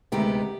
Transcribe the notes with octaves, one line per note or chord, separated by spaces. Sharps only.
D2 C3 D#3 G#3 B3 G4